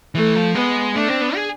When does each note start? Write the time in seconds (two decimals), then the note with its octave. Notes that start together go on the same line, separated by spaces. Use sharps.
0.15 E3 A3
0.35 F3
0.55 G#3 B3
0.95 A3 D4
1.08 C4
1.21 B3
1.35 G#4